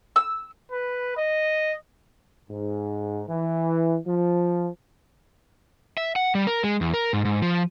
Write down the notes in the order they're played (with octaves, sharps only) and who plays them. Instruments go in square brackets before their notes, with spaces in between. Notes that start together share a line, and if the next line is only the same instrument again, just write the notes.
[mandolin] E6
[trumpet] B4
D#5
[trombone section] G#2
E3
F3
[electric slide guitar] E5
F#5
G3
A#4
G#3
E2
A#4
G#2
G#2
F3